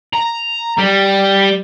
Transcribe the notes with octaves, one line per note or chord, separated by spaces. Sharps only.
A#5
G3